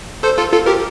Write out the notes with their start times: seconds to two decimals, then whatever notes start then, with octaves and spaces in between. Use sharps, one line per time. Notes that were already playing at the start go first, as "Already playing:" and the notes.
0.23 A4 C5
0.38 F4 A4
0.52 F4 A4
0.66 G4 A#4